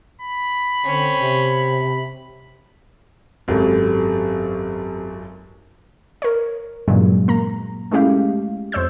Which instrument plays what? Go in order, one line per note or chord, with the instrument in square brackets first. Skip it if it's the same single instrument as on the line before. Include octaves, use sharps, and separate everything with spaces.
[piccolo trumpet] B5
[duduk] D3 [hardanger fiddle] C4 C#4
[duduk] C3
[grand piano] G#1 F#2 [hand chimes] C4 G4 A4
[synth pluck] A#4 C#5
G2 A#2 C#3 E3 F#3 G#3
A#3 A#5
G#3 A3 C#4 E4 G4 F5
F2 C5 C#5 E6 G6